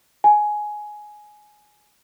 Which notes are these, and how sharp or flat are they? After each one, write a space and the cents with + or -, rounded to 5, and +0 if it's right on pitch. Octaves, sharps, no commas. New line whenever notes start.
G#5 +10